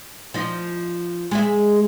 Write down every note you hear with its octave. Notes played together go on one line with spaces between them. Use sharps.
F3 D#4
G#3 G#4 E5